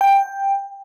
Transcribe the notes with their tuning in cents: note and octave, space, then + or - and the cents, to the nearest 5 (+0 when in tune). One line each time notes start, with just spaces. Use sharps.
G5 +10